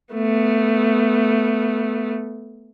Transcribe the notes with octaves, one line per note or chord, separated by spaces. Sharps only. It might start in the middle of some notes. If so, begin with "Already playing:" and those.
A3 B3